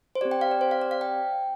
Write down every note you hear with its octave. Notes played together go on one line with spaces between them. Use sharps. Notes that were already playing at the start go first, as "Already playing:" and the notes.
C5
C4 G4 D5
G5
F5
D5
C5
F5
D5
F5
G5